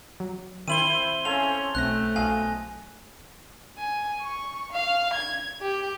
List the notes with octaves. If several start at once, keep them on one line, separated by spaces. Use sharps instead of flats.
F#3
D#3 C4 E4 C5 D#7 F#7 G7
C#4 A4 C5 F5 G#5 F7
B1 A3 C4 F#6 A#6
B1 D#5 F5 G#5
G#5
C#6
F5
G#6
G4